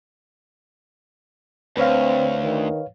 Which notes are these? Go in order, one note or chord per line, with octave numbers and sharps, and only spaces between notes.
D2 C4 B4 C#5 F5
D#3